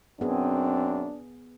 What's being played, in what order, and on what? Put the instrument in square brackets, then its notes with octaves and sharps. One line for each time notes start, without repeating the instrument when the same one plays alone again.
[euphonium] F#2 [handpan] B3 G#4 [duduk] C4 [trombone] D4